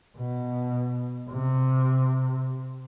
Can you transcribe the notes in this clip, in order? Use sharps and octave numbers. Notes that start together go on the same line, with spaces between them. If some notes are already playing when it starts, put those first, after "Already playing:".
B2
C3